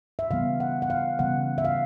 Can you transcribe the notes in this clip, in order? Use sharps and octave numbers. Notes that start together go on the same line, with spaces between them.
E5
C#3 E3 G3 B3 F5
F#5
F#5
F5
C#3 E3 G3 B3 F#5
E5
F5